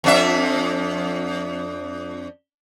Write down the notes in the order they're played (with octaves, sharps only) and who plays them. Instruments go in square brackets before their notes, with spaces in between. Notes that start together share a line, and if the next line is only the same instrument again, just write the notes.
[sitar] F2 D4 E5